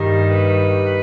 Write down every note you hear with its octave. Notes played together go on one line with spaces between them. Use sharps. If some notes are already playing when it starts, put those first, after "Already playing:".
Already playing: G2 D#3 G3 A#4
B4